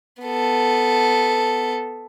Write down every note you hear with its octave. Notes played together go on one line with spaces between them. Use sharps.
B3 A4